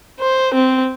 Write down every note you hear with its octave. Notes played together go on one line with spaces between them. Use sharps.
C5
C4